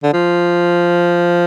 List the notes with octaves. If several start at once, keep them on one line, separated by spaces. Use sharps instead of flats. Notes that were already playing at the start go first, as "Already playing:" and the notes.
D3
F3